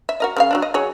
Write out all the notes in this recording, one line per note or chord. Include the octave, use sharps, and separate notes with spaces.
E5
F#4 A#4 D#5
C#3 E4 F5
F#3 C#4 D4
D#5
F#3 G#4 C#5